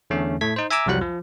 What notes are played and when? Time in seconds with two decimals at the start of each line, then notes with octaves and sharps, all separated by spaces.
0.10 E2 D3 A3 C#4
0.41 A2 A3 G#6 B6
0.56 D#4 C5
0.70 E5 G#5 A#5 D6 E6
0.86 C2 F2 F#3 G3 F#5 F#6
1.01 F3